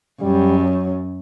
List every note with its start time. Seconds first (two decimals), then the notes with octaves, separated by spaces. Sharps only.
0.21 F#2 G3
0.59 F#3